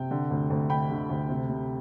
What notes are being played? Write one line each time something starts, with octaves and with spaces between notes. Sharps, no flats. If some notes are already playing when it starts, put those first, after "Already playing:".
Already playing: C3 G5
D3
D2
D2
D3 G5 B5
D3
D2
C3
C3